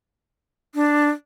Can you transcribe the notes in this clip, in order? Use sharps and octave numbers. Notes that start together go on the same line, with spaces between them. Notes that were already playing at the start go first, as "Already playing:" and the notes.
D4